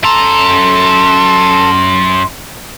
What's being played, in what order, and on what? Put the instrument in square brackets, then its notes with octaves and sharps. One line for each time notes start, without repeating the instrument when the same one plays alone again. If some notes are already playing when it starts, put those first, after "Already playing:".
[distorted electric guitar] F#2 A#5 [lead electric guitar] A4 [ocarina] C6